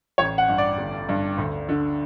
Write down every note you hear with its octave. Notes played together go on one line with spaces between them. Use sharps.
A1 C#5
F#5
G2
D5
G1
G2
D2
D3